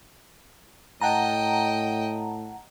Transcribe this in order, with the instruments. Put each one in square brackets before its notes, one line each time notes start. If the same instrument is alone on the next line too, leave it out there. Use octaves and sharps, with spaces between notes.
[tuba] A2 [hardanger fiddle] D#5 G5 [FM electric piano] F#5 A5 A#5